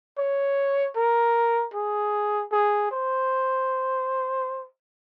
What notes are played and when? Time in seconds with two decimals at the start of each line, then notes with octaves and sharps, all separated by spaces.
0.18 C#5
0.96 A#4
1.74 G#4
2.52 G#4
2.91 C5